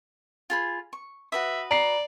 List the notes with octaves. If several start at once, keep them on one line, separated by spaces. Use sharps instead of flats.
F4 G#4 B5
C#6
F#4 B4 E5 D#6
D5 A#5 C7